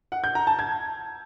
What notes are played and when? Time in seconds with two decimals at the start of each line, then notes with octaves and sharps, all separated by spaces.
0.12 F#5
0.24 G6
0.35 A#5
0.47 A5
0.59 G#6